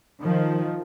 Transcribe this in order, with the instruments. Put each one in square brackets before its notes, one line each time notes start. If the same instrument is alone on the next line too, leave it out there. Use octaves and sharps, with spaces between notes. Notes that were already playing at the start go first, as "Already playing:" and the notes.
[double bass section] D#3 F3